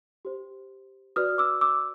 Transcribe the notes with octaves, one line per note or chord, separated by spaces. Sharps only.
G4 C5
F#4 B4 D5 D#6 F6
D6 E6
D6 E6